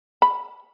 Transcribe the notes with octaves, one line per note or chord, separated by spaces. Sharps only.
B5